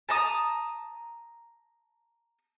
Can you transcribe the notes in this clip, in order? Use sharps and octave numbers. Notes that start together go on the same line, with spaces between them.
A5 A#5 D#6